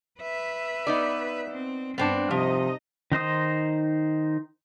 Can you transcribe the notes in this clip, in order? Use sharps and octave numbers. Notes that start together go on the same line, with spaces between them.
B4 E5
B3 D#4 D5
C4
G2 B3 C4 D4
C3 F3 D#4 D#5
D#3 D#4 C5 D#6